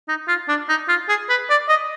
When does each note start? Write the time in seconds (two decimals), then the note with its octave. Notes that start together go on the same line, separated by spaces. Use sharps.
0.08 D#4
0.28 F4
0.48 D4
0.69 D#4
0.88 F4
1.09 G#4
1.29 B4
1.50 D5
1.69 D#5